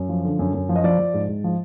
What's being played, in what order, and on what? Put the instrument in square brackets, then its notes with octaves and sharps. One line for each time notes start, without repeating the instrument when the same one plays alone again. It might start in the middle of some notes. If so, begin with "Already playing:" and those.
Already playing: [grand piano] F#2
F3
D3
F#2
F#2
F3
D#5
F3 D5
F3
G#2
G#2
F3